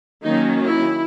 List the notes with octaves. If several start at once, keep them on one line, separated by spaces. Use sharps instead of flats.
D#3 F#3 A#3 C#4 D#4
E4